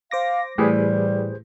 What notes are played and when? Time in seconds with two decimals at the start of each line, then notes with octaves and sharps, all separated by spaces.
0.11 C5 F5 D6 A#6
0.58 A2 E3 G3 G4 G#4 B4 C5